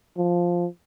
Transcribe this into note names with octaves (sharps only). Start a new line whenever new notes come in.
F3